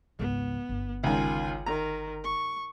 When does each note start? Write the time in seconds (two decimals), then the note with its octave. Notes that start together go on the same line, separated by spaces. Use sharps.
0.19 G#1 C#2 B3
0.69 G1
1.04 C#2 D#3 F4 G#5
1.66 D#3 A#5
2.24 C#6